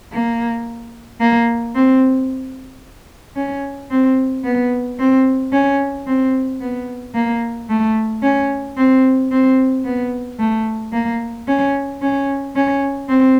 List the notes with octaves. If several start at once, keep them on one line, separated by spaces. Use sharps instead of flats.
A#3
A#3
C4
C#4
C4
B3
C4
C#4
C4
B3
A#3
A3
C#4
C4
C4
B3
A3
A#3
C#4
C#4
C#4
C4